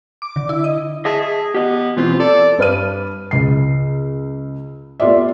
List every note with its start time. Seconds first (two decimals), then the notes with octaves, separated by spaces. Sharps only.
0.22 D6
0.36 D3
0.49 E4
0.64 D#5
1.05 G#4 D#5 E5 A5
1.21 G#4
1.55 B3 G4 D#5
1.97 B2 E3 C4 F4
2.20 A4 D5
2.58 G2 B4 F6 D#7
3.31 C#2 C7
5.00 A3 B3 F4 G4 D5 E5